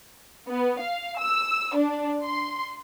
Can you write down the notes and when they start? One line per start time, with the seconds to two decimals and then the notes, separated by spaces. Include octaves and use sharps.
0.48 B3
0.80 F5
1.18 E6
1.75 D4
2.23 C6